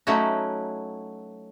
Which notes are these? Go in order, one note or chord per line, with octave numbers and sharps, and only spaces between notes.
F#3 A3 C#4 D#4 E4 F#4